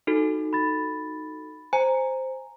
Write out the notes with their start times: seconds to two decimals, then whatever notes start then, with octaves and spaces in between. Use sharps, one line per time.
0.07 D#4 F#4 A4
0.53 B5 A6
1.73 C5 G#5 A#5